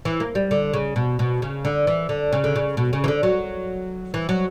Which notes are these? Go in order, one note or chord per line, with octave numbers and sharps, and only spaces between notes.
E3
A#3
G3
D3
C#3
B2
B2
C#3
D3
E3
D3
C#3
D3
C#3
B2
C#3
E3
D3
F#3
E3
F#3